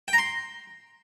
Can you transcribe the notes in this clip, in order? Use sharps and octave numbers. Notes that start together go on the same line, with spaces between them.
G5
A#5
C6